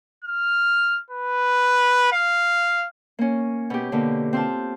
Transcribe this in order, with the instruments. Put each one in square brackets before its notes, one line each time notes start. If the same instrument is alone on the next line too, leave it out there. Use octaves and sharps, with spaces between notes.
[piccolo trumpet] F6
B4
F5
[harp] A#3 C#4
B2 G4
B2 D3 A#3
C4 F4 A5